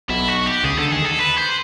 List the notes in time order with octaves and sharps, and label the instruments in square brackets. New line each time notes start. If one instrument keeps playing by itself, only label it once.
[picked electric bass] B1 B2 [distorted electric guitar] E4
[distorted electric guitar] F#4
G4
[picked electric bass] C#2 C#3 [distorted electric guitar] G#4
[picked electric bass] D2 D3 [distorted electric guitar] A4
[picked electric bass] D#2 D#3 [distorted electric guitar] G#4
[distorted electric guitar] A4
B4
C5